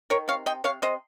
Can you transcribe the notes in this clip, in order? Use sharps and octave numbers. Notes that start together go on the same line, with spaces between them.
D#3 A#4 C#5
C3 C#5 F5
C3 D#5 G5
C3 C#5 F5
C3 C5 D#5